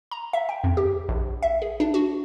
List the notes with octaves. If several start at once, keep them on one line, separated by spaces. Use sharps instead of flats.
A#5
E5
G5
F2
G4
A#1
E5
G#4
D4
F#4